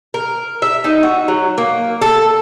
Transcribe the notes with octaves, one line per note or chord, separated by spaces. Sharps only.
A#4
E5
D#4
F#4
F#3
A#3
A4